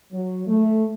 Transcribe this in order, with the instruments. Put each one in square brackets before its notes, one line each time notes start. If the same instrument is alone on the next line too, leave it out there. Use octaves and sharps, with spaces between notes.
[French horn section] F#3
A3